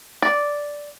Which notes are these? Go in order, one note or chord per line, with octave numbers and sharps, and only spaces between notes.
D5